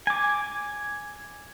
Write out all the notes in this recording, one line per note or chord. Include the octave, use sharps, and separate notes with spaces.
G#5 D6